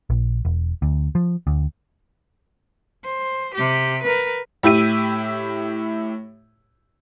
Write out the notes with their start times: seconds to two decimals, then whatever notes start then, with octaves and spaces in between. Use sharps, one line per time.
0.10 A#1
0.45 E1
0.82 D2
1.15 F3
1.47 D2
3.05 C5
3.54 C3 G4
4.03 A#4 B4
4.63 A2 E4 G4 E5 D#7